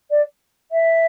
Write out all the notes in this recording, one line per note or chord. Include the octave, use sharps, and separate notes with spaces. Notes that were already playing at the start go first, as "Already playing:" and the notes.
D5
E5